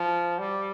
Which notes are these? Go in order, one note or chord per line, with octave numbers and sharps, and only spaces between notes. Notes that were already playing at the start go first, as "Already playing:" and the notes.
Already playing: F3
G3